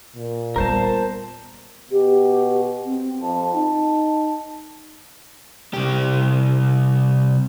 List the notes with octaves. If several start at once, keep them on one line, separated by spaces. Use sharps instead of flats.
A#2
G3 B3 A#4 C5 A5
B2 G4
C4
F2 A5
D#4
C2 G4